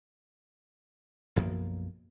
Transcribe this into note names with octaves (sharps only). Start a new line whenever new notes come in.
B1 F#2 F3 A#3